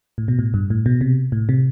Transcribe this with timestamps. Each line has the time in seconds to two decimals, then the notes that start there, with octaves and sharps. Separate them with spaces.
0.18 A2
0.28 B2
0.39 A2
0.54 G2
0.70 A2
0.86 B2
1.01 C3
1.32 A2
1.49 C3